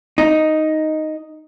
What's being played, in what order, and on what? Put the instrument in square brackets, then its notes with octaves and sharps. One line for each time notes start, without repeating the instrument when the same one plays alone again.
[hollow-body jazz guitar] D#4